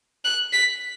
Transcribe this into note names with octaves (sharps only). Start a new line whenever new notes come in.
F#6
B6